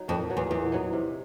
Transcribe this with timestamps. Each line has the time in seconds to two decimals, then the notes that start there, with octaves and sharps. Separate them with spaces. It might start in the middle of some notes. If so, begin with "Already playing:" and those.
Already playing: F#3 D#4
0.08 F2 A#2
0.30 F#3 B3 D#4
0.37 E2
0.50 E2 A#2
0.72 F#3 B3 D#4
0.93 C3